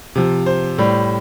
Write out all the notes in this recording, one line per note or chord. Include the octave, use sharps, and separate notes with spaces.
C3 F3
C5
A2 G3